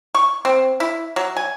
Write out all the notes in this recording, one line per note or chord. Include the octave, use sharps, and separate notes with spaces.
C#6
C4
E4
F#3
G#5